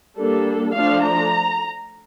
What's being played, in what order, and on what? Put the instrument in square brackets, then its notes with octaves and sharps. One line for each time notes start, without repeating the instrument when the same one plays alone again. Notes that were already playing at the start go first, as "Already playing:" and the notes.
[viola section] G3 A#3 D4 A4
F3 A3 D4 F5
A#5